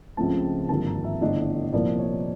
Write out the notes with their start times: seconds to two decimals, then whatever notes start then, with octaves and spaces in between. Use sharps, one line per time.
0.17 C#2 C#3 F3 A3 C4 A5
0.69 G#1 G2 D3 F3 A#3 A5
0.87 A#5
1.04 E5
1.21 G1 G2 E3 A3 D4 D#5
1.73 C2 A#2 F3 A#3 D5
1.99 C#5